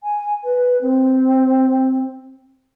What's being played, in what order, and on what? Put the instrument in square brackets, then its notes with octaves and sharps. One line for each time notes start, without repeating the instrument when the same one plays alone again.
[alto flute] G#5
B4
C4